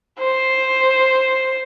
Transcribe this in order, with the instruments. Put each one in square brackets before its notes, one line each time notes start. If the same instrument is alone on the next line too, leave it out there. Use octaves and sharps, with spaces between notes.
[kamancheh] C5